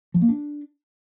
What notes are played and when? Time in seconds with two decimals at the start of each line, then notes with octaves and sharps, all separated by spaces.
0.14 F3
0.22 A#3
0.29 D4